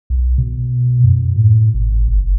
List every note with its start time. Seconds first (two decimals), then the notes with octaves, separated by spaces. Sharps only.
0.10 B1
0.38 B2
1.04 F#2
1.36 A2
1.74 G#1
2.08 F#1